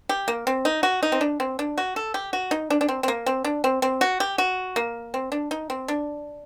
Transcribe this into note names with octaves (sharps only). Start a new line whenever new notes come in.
G4
A#3
C4
D#4
F#4
D#4
C4
D4
C4
D4
F#4
A4
G4
F#4
D#4
D4
D4
C4
C4
A#3
C4
D4
C4
C4
F#4
G4
F#4
A#3
C4
D4
D#4
C4
D4